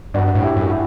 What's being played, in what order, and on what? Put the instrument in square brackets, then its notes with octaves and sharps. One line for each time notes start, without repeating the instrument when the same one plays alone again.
[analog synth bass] G2 [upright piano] D4 F#4
[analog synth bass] A2
[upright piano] E4 G4
[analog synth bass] F#2
[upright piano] E4 G4